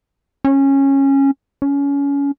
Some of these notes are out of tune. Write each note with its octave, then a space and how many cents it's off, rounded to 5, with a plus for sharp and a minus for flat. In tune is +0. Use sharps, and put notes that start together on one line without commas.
C#4 -15
C#4 +25